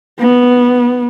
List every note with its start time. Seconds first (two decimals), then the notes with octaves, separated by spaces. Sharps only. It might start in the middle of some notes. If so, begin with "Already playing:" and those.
0.19 B3